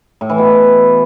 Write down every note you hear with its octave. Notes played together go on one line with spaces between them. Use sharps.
A2
E3
B2